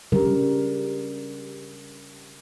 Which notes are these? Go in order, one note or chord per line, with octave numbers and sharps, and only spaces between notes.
C#3 G3 A#4